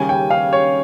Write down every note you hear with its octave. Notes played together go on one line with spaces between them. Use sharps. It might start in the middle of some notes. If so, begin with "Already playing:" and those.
Already playing: D#2 C#3 G3 C#4 G#5
G5
F5
C#5